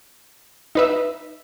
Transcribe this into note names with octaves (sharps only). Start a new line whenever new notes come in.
D#4 B4 E5